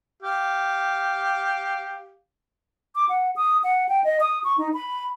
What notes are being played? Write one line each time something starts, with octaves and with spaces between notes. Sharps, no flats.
G4 F5
D6
F#5
D#6
F#5
G5
D#5
D#6
C#6
D#4
B5